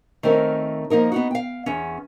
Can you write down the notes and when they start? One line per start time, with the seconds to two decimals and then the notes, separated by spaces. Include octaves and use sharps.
0.23 D#3 A3 C4 C#4 A#4
0.90 F3 A#3 D#4 A#4
1.12 B3 D#4 F#4
1.31 F5 G5
1.66 E2 B3 C#4